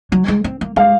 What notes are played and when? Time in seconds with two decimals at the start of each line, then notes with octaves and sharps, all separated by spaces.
0.12 F#3
0.28 G#3
0.44 C4
0.61 A#3
0.76 G#3 F5